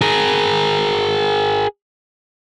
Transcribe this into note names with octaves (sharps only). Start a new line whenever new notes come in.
G#4 A#4